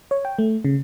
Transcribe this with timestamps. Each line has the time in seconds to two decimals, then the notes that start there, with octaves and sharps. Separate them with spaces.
0.11 C#5
0.25 G5
0.39 A3
0.65 C#3